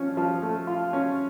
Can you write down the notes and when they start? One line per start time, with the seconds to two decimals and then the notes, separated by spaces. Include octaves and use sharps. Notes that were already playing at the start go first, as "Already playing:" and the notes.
Already playing: F3 C#4
0.17 F3
0.42 A3
0.67 F4
0.93 C#4